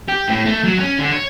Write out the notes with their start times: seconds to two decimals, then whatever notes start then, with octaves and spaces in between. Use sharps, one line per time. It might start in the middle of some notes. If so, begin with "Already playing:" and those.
0.08 G4
0.28 A2
0.46 A3
0.64 F#3
0.79 C#4
0.98 D3
1.12 C#5